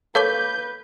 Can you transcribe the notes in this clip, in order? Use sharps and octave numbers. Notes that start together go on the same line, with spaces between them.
A#3 A4 B4 C#5 F5 D6 G6 G7